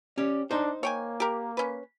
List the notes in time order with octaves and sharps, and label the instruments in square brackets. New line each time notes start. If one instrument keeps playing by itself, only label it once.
[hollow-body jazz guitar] C#4 G4 [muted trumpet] D5
[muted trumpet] D4 [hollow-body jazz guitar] D#4 C5
[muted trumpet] A#3 [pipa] C#5 G5 G#5
[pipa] G4 A#4
C#4 B4